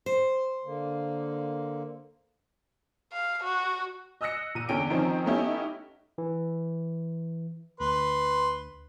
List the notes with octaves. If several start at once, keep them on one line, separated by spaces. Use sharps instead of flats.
C5
D3 A#3
F5
F#4
D#5 D#6 E6 F#6 A#6 C#7
A#2 D#7
E2 D3 C#4 G5 D7
D#3 F3 C4 C#4 D#4
A3 B3 C#4 D#4 E4 G4
E3
D2 B4 C6